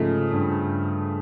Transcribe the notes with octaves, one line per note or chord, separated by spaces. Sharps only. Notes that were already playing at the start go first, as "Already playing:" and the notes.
Already playing: G#2 C#3 F3 A3
G2